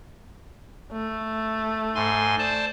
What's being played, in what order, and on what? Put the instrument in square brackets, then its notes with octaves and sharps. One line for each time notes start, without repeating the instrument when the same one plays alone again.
[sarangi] A3
[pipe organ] G#2 G#5 C6
C5 D5 A5